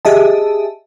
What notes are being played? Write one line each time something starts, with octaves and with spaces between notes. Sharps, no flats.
G4 G#4 D#5 E5 A5